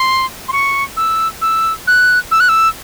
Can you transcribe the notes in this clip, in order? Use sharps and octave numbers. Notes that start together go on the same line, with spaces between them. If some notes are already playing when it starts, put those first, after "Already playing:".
Already playing: C6
C6
C#6
E6
E6
F#6
E6
F#6
E6